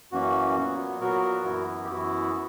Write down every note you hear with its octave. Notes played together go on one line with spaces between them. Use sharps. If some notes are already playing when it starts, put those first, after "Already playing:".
F#2 E3 A#3 C#4 F#4
A#2 F#3 B3
A#2 F#3 B3 F#4 A#4
F#2 E3 B3 E4
G4
F#2 E3 B3 E4 F#4
B3